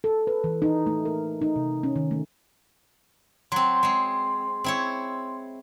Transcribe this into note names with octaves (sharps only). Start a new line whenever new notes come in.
A4
B4
E3
D#4
A3
A#4
D#4
C3
C#4
D#3
A3
F#3 C4 C6
G#3 C4
C4 E4 C#5